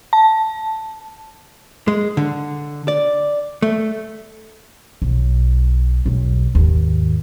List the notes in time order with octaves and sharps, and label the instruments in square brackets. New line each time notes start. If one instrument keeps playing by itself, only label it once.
[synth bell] A5
[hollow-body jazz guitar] G#3
D3
D5
A3
[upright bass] B1
B1 E2
D#2 G#2